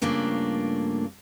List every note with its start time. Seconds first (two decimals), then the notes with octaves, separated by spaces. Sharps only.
0.02 G2 C#3 A3 A#3 D4 F4